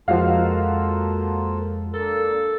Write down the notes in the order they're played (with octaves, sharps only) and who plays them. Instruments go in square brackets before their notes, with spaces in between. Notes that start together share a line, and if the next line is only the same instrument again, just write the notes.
[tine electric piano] F2 G#3 [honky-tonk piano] F3 F#4 F5 [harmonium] A#3 F4 A4
[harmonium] A#3 D4 [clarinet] A4 [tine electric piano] A#4